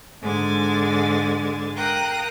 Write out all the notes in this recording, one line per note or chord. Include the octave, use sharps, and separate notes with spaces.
G#2 D3 G#3 G#5 A6
A#4 F5 G5 A#5 D#6 F#6